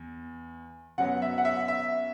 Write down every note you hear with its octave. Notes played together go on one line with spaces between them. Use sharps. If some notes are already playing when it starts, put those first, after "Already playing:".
Already playing: E2
F#2 F#3 B3 F#5
E5
F#5
E5
E5